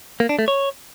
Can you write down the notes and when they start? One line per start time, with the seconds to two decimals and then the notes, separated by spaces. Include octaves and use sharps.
0.20 A#3
0.29 D4
0.39 A3
0.48 C#5